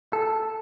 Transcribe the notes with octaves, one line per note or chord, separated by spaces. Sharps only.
A4